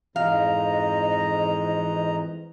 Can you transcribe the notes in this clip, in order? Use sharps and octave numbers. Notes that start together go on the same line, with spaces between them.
F2 G#2 E3 D#5 F5 A#5